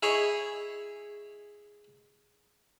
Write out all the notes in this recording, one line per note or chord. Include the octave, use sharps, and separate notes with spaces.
E4 G#4 C#5 D#5